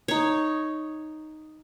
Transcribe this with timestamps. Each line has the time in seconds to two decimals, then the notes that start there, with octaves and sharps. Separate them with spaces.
0.08 D#4 C#5